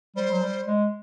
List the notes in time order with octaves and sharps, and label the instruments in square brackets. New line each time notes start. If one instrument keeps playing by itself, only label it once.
[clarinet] G3 [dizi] C5
[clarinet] F#3
G3
G#3